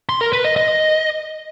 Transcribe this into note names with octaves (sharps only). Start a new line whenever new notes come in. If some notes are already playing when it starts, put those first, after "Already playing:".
C6
A#4
B4
D#5
D#5